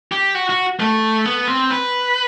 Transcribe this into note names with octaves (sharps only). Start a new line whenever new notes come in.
G4
F#4
F#4
A3
B3
C4
B4